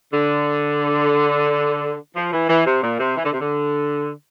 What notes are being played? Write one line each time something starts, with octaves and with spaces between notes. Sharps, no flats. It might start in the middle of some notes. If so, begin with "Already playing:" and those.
D3
F3
E3
E3
C3
A#2
C3
E3
D3
C3
D3